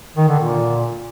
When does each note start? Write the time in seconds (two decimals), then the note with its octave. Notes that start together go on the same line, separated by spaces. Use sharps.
0.17 D#3
0.28 D3
0.40 A#2